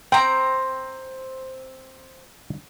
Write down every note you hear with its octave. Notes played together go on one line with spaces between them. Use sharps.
C4 G5 A#5